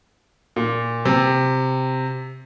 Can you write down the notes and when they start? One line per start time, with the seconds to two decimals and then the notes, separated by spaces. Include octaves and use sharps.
0.56 A#2
1.05 C3